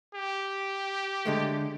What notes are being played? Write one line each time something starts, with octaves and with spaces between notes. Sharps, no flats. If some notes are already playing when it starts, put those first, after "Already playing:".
G4
D3 G#3 A3